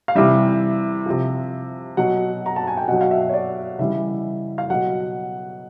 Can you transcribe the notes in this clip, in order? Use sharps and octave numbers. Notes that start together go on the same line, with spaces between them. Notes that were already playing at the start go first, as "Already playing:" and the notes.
F5
C3 E3 G3 E5
C3 F3
B2 F#3 F#5
A#5
A5
G#5
G5
B2 F#3 F#5
F5
E5
C#5
D5
C#3 E3 G3 E5
F5
B2 F#3 F#5